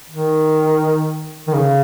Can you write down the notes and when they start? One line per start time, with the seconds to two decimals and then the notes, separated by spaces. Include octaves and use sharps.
0.10 D#3
1.48 D#3
1.53 C#3